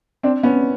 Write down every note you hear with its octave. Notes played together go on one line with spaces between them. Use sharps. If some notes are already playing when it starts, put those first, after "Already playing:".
C4 D4
B3 C#4